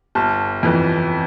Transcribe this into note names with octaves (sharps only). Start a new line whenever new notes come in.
G1 A5
F2 E3